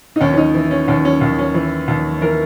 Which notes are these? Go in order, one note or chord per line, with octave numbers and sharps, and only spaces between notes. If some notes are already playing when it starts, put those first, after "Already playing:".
D#4
D#2 C#4
C#4
D#4
E3
C#4
D#2 C#4
C#4
D#2
C#4
E3
D#2
E3 A#4